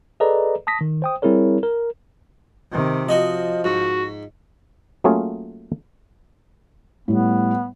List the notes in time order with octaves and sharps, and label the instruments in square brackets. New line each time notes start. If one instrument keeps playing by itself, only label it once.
[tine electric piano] G#4 A4 B4 D5 D#5 A#5
A5 D#6 A#6 B6
D#3
C5 G5 D#6
G3 C4 E4 G#4 A#4 C#5
A#4
[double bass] C3 D#3
[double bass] F3 [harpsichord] F#4 D#5
[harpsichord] G#2 [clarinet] F#4
[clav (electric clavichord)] F#3 A3 A#3 C#4 F4 G#4
[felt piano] A2 G3 [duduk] B3